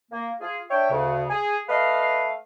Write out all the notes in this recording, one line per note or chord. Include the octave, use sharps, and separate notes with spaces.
A#3
F4 G#4
D4 C#5 E5 G5
D2 C#3
G#4
A3 B4 D#5 F5